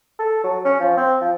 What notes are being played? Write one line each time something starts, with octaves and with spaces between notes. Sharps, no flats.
A4
F#3
C#4
F3
C4
F3